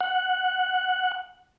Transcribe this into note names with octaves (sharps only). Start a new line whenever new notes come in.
F#5